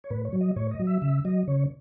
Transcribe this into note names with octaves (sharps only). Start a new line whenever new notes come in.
C#5
A2 B4
C#5
F#3
D#5
A2 C#5
D#5
F#3
E5
C#3 E5
F#3 D#5
C#3 C#5